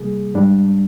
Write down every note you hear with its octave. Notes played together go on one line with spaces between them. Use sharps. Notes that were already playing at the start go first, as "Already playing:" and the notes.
Already playing: C3 G3 A#3 G#4
G#2 G3 D4